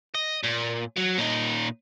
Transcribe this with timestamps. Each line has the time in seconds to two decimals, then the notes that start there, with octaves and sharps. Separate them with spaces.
0.15 D#5
0.43 A#2
0.96 F#3
1.18 A#2 D#4